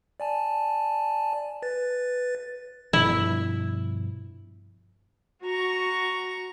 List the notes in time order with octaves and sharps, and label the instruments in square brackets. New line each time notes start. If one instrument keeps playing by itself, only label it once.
[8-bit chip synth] D5 G#5 A5
B4 A6
[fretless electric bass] G2 B2 F3 [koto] E4
[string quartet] F#4 A#5 C#6